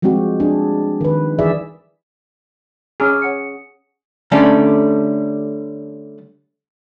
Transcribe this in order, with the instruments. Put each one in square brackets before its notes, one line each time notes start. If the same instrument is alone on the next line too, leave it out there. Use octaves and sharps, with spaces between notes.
[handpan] F3 G3 G#3 C4 F#4 G4
D4 G#4
D#3 B4
E3 G#4 D5 E5
[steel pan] C#4 G#4 [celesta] A#5 D6 F6
[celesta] C#5 F#5 C#7
[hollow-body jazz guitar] D3 G3 A3 C#4 D4